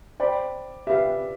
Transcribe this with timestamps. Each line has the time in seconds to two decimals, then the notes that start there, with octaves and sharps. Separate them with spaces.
0.20 C5 D5 G5 B5
0.87 G4 B4 E5 F5